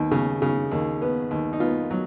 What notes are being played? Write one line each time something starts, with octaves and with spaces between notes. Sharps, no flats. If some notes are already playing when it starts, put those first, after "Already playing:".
Already playing: D#2 B3
C#3
C#3
D#2
B3
D#2
D#4
B3 F4
F#3